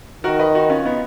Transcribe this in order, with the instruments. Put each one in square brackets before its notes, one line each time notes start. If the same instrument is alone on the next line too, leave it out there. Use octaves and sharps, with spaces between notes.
[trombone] D#3 [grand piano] F#4 A#4
[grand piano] B4 D#5
D#4 F#4
C#4 F4
B3 D#4